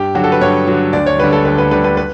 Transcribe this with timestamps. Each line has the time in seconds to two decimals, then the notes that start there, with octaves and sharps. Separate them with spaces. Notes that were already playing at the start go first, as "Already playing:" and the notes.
Already playing: G2 G4
0.15 D3 F#3 F#4
0.24 A4
0.32 B4
0.41 G2 C#5
0.67 D3 F#3
0.93 D2 D5
1.06 C#5
1.19 D3 G3 B4
1.32 A4
1.45 D2 B4
1.58 B4
1.71 D3 G3 B4
1.84 B4
1.97 B4